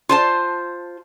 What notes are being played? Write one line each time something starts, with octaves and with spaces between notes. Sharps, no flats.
F4 C5 A5